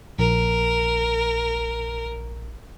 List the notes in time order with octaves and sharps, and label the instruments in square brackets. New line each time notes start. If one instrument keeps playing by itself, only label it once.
[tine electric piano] A#1 [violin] A#4